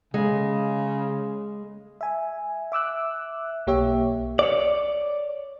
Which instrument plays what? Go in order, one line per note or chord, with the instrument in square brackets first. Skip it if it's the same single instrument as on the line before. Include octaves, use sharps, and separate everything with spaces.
[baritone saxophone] C#3 [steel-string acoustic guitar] G#3
[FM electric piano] E5 G#5
E5 D6 E6 F#6
B1 A#3 G4 C#5 E5
[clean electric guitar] C#5 D5